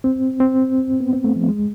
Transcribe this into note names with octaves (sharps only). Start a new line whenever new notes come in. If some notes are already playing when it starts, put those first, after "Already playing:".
C4
C4
B3
C4
A3
F3
G#3